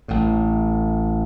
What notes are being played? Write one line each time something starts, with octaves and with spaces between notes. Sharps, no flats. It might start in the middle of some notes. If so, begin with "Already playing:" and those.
A1 A2